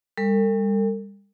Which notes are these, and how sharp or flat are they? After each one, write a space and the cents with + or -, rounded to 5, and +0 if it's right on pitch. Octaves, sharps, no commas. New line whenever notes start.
G3 +35 A4 +45